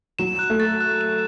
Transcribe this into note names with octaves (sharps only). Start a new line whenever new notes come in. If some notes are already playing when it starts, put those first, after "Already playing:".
F#3 E7
F#6
A3
A6
F#6
E7